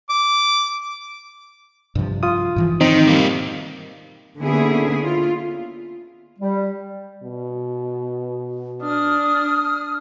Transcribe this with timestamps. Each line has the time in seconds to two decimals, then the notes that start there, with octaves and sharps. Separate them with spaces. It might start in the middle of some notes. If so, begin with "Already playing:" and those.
0.10 D6
1.95 G2 C3 F3
2.23 F4 D#6
2.56 G#2 E3 F3
2.81 D#3 C4 D#4
3.07 G3 A#3
4.39 D3 A#3 B3 C#4 E4 G#4
5.03 F4
6.39 G3
7.23 B2
8.82 D4 D#6 F6